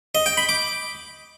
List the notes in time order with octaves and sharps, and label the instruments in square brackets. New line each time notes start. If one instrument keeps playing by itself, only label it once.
[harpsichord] D#5
G5
B5
D6